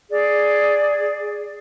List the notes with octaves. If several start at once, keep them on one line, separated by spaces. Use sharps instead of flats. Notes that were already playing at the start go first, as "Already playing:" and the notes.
G#4 D5